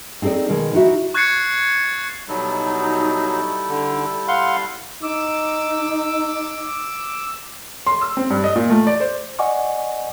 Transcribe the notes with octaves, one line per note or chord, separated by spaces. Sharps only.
C4 D#4 G#4 A4 D5
B2 D#3 G#3
D#4 E4 F#4 E5
C#6 F#6 G#6 A6 C7 C#7
B2 F#3 G3 D#4 E4 A4
D3
F5 F#5 C6
D#4 D6 E6
C6
E6
C4
G2
D#5
A#2
A3
D5
C5
D5 D#5 F#5 G#5 C#6 D6